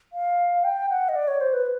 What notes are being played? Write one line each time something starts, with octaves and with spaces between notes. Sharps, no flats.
F5
G5
F#5
D#5
D5
C#5
C5
B4